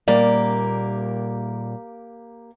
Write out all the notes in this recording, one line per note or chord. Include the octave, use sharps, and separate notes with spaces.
A#2 G3 A#3 G4 D5